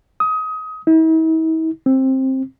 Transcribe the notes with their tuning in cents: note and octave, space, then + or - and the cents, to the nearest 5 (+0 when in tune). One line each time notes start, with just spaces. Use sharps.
D#6 +25
E4 -45
C4 +15